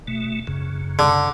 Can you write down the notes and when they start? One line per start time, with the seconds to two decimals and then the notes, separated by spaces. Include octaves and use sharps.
0.08 B2 A3
0.47 F#2 C#3
0.99 D3